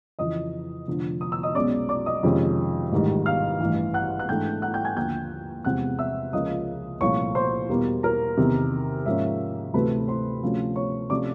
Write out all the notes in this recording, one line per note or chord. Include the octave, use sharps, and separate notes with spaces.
F2 C#3 E3 D#5 D#6
F1 F2 D3
D#6
E6
D#5 D#6
B1 B2 G#3 C#4 D5 D6
D5 D6
D#5 D#6
F2 C3 D#3 G#3 C#4
A1 G#2 D#3 G3
F5 F6
A1 G2 E3
F#5 F#6
F#6
G#2 E3 A3 D4 G5 G6
F#5 F#6
G5 G6
G#5 G#6
D#2 D3 F3 G5 G6
E2 C3 F3 G#3 C4 F#5 F#6
E5 E6
C#2 C#3 F3 A#3 D#5 D#6
C2 A#2 F3 A3 C#5 C#6
C5 C6
E2 B2 G3 A#3
A#4 A#5
E2 C3 D#3
G#2 F3 A#3 C#4 E5
D2 C3 E3 A3 C4 B4 B5
C5 C6
D2 C3 F3 A3 C#4
C#5 C#6
C3 F3 A3 C#4 D5 D6